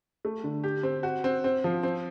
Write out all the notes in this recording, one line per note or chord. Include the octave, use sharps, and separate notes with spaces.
A3
D3
G4
C4
F#4
C4
C4
F3
C4